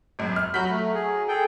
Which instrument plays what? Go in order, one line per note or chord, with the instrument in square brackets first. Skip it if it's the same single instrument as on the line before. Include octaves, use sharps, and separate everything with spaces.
[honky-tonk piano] G#1 F#2
F6
[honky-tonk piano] F#3 B6 [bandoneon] F#4 B5 G6
[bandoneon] A3
G#4
G#4 A4 G5